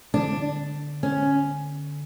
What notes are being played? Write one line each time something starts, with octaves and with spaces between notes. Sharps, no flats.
D3 D4
C#4